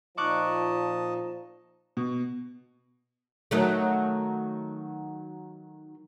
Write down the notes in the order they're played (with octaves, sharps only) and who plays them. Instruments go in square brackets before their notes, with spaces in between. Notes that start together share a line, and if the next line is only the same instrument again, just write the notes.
[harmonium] A#2 D#4 [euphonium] F3 [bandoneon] D#5 A5 [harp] C#6 D6 F#6
[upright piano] B2
[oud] D#3 F#3 A3